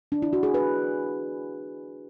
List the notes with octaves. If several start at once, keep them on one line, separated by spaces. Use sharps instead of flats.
D4
E4
F#4
G#4
B4